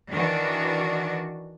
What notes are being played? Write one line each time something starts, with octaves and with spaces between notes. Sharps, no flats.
D#3 E3 D4 F#4